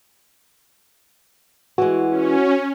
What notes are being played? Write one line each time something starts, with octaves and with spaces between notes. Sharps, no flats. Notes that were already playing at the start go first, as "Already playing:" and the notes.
E3 G#3 F#4
C#4